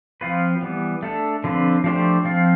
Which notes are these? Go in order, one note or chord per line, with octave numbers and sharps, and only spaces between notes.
F3 C4 F4 B4
E3 G3 B3
A3 D4 A4
D3 F3 C4 F4 B4
F3 A3 D4 G4 C5
F3 C4 F4